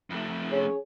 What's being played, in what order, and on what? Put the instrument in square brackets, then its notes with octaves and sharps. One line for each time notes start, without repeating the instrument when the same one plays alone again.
[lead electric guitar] F2 A3
[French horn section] C#4 G#4 C#5